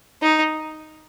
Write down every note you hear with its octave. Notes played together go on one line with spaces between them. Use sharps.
D#4